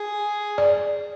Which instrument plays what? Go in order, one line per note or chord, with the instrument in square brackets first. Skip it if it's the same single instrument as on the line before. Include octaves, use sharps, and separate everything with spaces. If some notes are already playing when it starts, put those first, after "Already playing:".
Already playing: [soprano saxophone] G#4
[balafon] D5